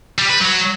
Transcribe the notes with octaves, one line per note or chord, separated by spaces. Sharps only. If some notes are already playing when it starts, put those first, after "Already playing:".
G3
B4
F#3